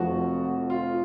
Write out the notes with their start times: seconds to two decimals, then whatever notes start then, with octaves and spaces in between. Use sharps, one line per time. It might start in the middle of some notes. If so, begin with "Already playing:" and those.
Already playing: F1 F2 F3 F#4
0.70 F4